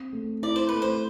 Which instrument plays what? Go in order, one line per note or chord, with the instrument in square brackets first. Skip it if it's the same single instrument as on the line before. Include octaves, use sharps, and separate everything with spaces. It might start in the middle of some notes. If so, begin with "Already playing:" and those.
Already playing: [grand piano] C4
A3
[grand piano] E4 [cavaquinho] D5
[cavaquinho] C5
[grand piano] A3 [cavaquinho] B4
[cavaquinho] C5